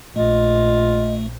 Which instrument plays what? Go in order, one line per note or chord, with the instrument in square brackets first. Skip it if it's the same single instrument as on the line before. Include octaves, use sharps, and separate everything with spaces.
[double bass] A#1 [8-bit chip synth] A3 [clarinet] F4 [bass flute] D#5